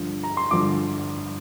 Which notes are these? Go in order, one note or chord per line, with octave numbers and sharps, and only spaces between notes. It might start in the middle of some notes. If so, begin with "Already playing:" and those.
Already playing: G2 D3 F3
A#5
C6
G2 D3 F3 D6